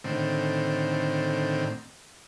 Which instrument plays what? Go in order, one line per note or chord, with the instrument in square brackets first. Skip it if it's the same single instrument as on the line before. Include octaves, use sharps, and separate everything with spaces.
[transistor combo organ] A2 D3 D#3 C4